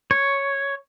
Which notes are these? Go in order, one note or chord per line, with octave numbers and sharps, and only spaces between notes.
C#5